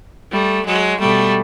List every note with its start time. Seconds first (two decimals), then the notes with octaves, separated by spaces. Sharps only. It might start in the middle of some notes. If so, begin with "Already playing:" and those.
0.31 G3 A3
0.66 F#3 G#3
1.00 B2 G3 A3